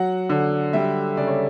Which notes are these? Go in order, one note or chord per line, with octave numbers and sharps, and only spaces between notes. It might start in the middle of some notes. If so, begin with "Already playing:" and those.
Already playing: F#3 F#5
D3
G3 E5
C#3 D5
C#5